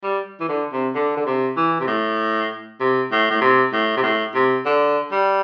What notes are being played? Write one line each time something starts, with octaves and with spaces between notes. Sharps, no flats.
G3
E3
D3
C3
D3
D3
C3
E3
C3
A2
C3
A2
A2
C3
A2
C3
A2
C3
D3
G3